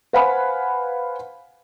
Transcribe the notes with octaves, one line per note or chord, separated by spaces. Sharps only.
B4 C5 F5 F#5 G#5 B5